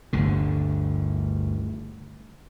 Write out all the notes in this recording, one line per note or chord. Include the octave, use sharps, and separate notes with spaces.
G1 D2 D3